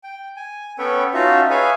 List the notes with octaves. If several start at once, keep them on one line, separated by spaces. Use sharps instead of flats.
G5
G#5
B3 C#4 A4 B4 C#5 G5
C#4 D#4 F4 F#4 E5 A5
G#4 B4 C#5 E5 F5 G#5